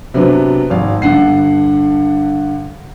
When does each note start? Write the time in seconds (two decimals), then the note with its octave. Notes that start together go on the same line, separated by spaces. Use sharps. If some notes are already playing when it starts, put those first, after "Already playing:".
0.14 C3 F#3 B3 D4
0.70 G#1 F5
1.02 G2 D3 F#5 C7